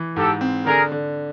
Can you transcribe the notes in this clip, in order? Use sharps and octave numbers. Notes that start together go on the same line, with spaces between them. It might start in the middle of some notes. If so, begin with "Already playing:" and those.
Already playing: E3
G#2 G4 A4
C4
D3 G#4 A#4
D3